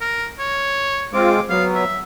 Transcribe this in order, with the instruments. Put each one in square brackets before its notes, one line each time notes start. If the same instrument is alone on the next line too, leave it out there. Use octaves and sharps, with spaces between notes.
[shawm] A#4
C#5
[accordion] G#3 C4 F4 [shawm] D6
[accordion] F#3 B3 [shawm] F5
[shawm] E5